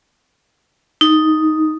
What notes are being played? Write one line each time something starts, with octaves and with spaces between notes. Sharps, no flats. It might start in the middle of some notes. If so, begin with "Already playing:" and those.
D#4